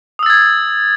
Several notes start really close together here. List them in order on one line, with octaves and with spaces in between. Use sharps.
D#6 E6 A6 G#6